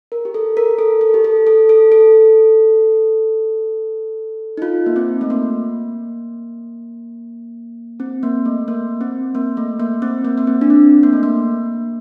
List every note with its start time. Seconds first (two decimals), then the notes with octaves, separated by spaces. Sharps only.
0.12 A#4
0.25 G4
0.34 A4
0.57 A#4
0.79 A4
1.01 A4
1.14 G4
1.24 A4
1.47 A4
1.69 A4
1.92 A4
4.57 D#4
4.62 F4
4.86 A#3
4.96 C4
5.21 A3
5.30 A#3
8.00 C4
8.23 A#3
8.45 A3
8.68 A#3
9.01 C4
9.35 A#3
9.57 A3
9.80 A#3
10.02 C4
10.24 A#3
10.38 A#3
10.47 C4
10.61 D4
10.70 C4
11.03 A#3
11.13 A3
11.23 A#3